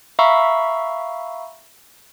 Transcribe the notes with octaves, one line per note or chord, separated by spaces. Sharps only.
E5 F5 A#5 B5 C#6 E6